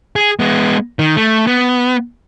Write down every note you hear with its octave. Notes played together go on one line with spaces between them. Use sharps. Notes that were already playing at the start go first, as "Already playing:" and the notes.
G#4
G#3 B3
D#3
A3
B3